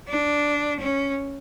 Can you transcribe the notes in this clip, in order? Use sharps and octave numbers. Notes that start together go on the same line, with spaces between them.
D4
C#4